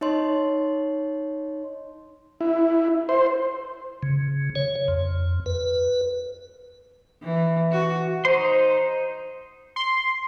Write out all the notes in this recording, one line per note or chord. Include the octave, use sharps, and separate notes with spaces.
D#4 C#5 D#5 C6
E4
C5
C#3
C#5
F2
B4
E3
F#4
D#4 C5 C6
C6